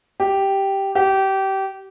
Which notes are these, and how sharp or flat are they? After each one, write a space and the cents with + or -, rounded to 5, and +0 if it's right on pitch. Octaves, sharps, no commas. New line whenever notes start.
G4 -5
G4 -25